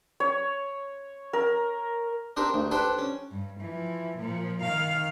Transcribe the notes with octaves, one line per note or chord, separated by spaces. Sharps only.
C#5
A#4
C4 D4 G4 A#4 C5
D2
D4 G4 A4 B4 C5 G5
C#4
G2
E3 F3
A#2 F3
D#3 F5